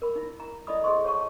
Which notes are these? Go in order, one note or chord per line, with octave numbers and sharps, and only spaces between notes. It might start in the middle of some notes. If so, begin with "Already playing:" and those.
A#4 B5
D#4 E4
A#5
E4 A4 D5 D#5 B5 D#6
G#4 A4 C5 D#5 C6 C#6
C#5 F#5 A5 C#6